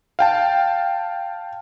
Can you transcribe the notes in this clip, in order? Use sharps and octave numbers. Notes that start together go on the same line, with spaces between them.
F5 G5 A5